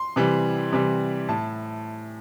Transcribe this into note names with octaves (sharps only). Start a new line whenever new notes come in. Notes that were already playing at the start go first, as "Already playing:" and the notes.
Already playing: C6
C3 E3 G3
C3 E3 G3
A2 A5